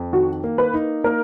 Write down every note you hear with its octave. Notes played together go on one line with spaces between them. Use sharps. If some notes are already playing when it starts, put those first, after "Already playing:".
Already playing: F2
D#3 F#4
A#3
B4
D#4
A#3 A#4